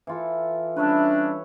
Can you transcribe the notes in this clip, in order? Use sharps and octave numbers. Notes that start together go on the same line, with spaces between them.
E3 F4 A4
G3 C#4 D4 B4 C#5 E5